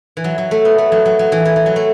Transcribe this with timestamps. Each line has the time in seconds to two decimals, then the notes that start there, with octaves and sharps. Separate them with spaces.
0.17 E3
0.24 F#3
0.38 F#3
0.51 A3
0.65 B3
0.78 A3
0.92 F#3
1.05 F#3
1.19 F#3
1.32 E3
1.45 E3
1.56 E3
1.66 F#3
1.76 A3